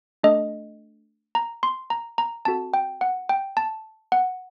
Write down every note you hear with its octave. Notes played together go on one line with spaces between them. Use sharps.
A3 D4 A4 D#5
A#5
C6
A#5
A#5
C4 F#4 A4 A5
G5
F#5
G5
A5
F#5